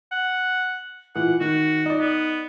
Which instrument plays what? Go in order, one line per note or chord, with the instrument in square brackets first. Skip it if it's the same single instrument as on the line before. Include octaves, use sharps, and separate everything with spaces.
[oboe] F#5
[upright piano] A#2 E3 [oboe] F#5
[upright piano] D#3 [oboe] F#4
[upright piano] D#4 D5
[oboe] B3